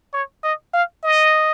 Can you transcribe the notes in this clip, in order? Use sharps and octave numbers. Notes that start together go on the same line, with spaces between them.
C#5
D#5
F5
D#5